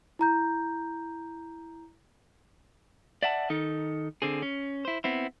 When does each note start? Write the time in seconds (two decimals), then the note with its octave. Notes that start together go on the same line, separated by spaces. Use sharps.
0.19 E4 A#5 G6
3.23 D5 E5 F#5 A5
3.50 D#3 D#4 A4
4.22 D3 C4 G#4
4.42 C#4
4.85 E4 C5
5.04 B3 C4 E4